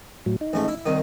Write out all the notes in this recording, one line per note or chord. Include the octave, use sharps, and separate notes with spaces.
A2 F#3
D#4
A1 G#3 A3
E4
C2 D#3 D#6